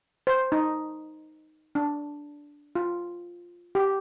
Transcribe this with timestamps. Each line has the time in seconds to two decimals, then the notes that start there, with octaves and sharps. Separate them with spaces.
0.27 C5
0.52 D#4
1.75 D4
2.76 F4
3.75 G4